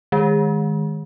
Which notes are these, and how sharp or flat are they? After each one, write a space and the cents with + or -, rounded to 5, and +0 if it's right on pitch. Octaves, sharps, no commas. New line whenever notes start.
D#3 +0 G#3 +0